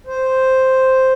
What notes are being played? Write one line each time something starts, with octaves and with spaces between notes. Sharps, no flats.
C5